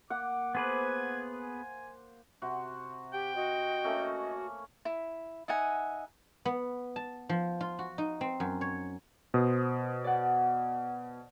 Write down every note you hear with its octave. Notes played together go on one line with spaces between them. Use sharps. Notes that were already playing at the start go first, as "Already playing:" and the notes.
A#3 F#5 D6
B3 G#4 B4 C5 D6 G#6
G#5
C3 F#4 C6
G4 G5
F#4 D#5
A3 A#3 C#4
E4
D#4 E5 F#5 G#5
B3
A5
F3
F4
F#4
D#4
C4
F#2
C#5
B2 C5 D#6
D5 F#5